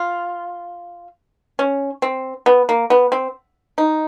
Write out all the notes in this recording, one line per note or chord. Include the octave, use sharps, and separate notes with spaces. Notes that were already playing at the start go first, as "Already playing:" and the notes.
Already playing: F4
C#4
C4
B3
A#3
B3
C4
D#4